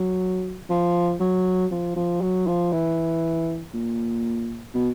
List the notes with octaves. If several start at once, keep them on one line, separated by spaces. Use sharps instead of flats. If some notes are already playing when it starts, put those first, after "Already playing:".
Already playing: F#3
F3
F#3
F3
F3
F#3
F3
E3
A#2
B2